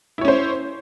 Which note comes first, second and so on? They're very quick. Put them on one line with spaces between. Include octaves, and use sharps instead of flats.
E4 C#5 C#4 C5